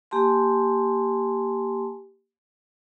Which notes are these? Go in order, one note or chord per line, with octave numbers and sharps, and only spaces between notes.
A#3 G4 G#5 A5 C6